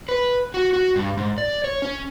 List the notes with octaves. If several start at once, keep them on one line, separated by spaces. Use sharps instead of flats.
B4
F#4
F#4
G2
G#2
D5
C#5
C#4